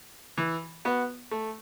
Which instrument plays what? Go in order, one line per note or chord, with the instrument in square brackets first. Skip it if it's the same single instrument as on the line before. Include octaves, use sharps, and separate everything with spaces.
[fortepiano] E3
B3 F#4 B4
A3